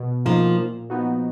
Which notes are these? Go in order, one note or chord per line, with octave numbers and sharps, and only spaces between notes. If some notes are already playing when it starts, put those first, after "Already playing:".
Already playing: B2
F3 A#3 D#4
A#2
F3 B3 D#4 F#4